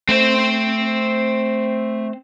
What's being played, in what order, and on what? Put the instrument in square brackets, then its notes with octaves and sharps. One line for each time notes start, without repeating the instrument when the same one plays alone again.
[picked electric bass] A3 [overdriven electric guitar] C4 C5